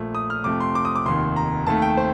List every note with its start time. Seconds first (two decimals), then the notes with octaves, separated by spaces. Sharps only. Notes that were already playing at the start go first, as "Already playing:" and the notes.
Already playing: A#1 A#2 A3
0.15 D#6
0.30 F6
0.44 F2 C3 F3 A3 D6
0.60 C6
0.75 D6
0.85 D#6
0.96 D6
1.06 F1 D#2 D#3 C6
1.36 A#5
1.67 D#2 D#3 A3 A5
1.82 G5
1.97 C5